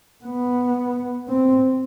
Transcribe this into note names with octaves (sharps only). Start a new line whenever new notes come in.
B3
C4